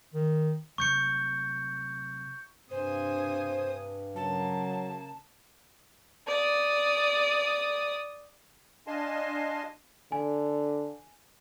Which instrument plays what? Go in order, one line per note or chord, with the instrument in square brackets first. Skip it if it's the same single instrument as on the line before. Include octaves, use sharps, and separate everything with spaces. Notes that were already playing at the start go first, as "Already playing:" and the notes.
[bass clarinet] D#3
[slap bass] C3 F#3 A3 [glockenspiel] C#6 G6 C#7
[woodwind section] G2 [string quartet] C3 G#5 D#6 [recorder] C5
[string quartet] C#3 A#3 [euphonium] F#3 [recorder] A5
[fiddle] D5 D#6
[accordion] D4 D#5 F5 G#5 A5 C6
[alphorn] D3 [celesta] G#5